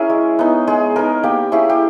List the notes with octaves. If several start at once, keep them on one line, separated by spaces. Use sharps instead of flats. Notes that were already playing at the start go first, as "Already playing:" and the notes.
Already playing: C#4 E4 G#4 A#4
G#3
B3 D#4
G#3 G#4
B3 D#4 A#4
A#3 G4
C#4 E4 G#4
G4